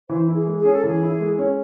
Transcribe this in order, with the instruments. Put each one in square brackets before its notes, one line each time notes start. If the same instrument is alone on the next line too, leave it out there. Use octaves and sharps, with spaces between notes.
[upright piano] E3 [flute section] C5
[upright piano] E4
[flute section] G#4
[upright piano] G#3
[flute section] G#4
[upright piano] C#4
[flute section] A4
[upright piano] E3 [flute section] G#4
[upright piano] E4
G#3
C#4